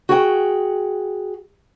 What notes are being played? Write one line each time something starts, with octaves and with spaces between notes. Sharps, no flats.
F#4 G#4 G5